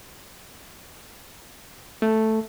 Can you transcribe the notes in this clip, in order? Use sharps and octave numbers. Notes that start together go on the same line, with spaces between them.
A3